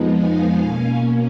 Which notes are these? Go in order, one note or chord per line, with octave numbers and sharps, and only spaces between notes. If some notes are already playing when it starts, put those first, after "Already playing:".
Already playing: F2 F3 G#3 B3 D#4
F5 G#5
B2 A#3 C#4